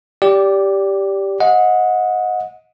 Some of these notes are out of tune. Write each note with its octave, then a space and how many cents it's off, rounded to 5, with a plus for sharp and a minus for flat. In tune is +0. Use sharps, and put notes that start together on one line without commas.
G4 +0 D5 -20
D#5 +15 F#5 -25